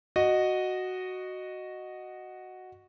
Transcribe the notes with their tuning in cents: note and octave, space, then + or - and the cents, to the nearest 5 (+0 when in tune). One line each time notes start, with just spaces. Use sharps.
F#4 +0 D#5 -10